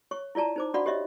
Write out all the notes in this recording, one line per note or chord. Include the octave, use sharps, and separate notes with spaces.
C#5 C#6
E4 F4 D5 A5 A#5
D#4 C5 D6
D4 F#4 D5 F5 F#5 B5
G4 C#5 D#5 E5